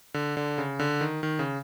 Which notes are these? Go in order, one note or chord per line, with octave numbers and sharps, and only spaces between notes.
D3
D3
C#3
D3
D#3
D#3
C#3